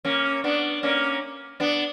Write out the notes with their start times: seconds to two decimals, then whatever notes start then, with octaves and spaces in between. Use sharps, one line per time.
0.05 A#3 C#4
0.44 B3 D4
0.83 A#3 C#4
1.60 B3 D4